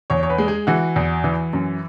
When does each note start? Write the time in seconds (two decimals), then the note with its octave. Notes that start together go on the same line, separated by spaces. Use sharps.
0.10 E2 C#5
0.23 C#5
0.30 B4
0.38 G#3
0.48 G#4
0.67 E3 F#4
0.96 E2
1.24 E3
1.53 F#2